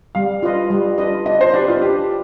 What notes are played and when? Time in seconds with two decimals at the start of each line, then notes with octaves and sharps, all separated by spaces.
0.15 G3 F5
0.42 D4 F4 B4 D#5
0.70 G3
0.98 D4 F4 B4 D#5
1.26 D4 D#5
1.41 C5
1.54 D4 G4 B4
1.68 F4
1.81 D4 G4